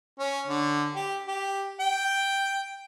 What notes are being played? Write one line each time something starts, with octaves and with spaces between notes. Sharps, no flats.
C#4
D3
G4
G4
G5